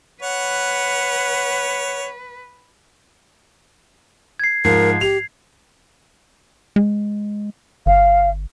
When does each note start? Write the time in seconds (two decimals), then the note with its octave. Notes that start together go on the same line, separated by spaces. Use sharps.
0.22 B4 C#5 F#5
4.40 G#6 C7
4.65 G#2 F3 A#4 C7
5.01 G4 F7
6.76 G#3
7.86 G1 F5